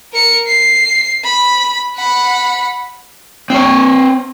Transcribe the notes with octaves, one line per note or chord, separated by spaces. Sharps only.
A#4 C#7
C7
B5
F#5 B5
C4 C#5